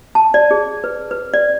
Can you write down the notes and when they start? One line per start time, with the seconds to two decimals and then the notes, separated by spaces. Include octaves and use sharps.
0.15 A5
0.34 D5
0.51 G#4
0.84 B4
1.11 B4
1.34 D5